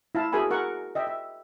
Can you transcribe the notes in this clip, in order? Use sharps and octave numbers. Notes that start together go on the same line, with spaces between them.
E4 F5 A5
F#4 G#4 A#4 E5 G#5 B5
A#4 F#5 C#6
D#5 E5 G5
E5